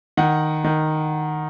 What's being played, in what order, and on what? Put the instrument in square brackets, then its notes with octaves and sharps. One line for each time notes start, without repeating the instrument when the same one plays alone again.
[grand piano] D#3 F#5
D#3